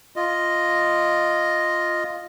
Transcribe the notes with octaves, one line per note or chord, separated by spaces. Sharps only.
F4 D#5